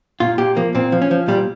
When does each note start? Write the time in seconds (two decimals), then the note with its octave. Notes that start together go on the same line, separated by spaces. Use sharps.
0.20 A#2 F4
0.38 A#2 G4
0.57 F3 A#3
0.75 A#2 C4
0.92 F3
1.02 C#4
1.11 F3
1.28 A#2 G3